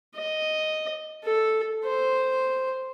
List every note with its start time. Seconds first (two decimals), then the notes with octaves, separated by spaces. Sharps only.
0.16 D#5
1.24 A4
1.85 C5